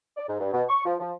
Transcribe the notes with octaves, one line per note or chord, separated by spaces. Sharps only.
D5
G#2
G2
B2
C#6
F3
F3